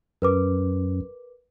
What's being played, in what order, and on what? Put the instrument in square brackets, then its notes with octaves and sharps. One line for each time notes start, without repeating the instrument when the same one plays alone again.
[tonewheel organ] F#2 [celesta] A#4 B4 D6